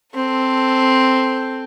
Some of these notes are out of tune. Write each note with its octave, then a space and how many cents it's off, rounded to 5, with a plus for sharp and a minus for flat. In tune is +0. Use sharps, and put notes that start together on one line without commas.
C4 +0 A4 +0